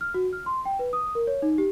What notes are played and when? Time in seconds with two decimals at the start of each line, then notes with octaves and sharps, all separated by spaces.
0.01 F6
0.14 F#4
0.33 F6
0.46 C6
0.65 G5
0.79 B4
0.93 D#6
1.15 A#4
1.27 C#5
1.42 D#4
1.58 G4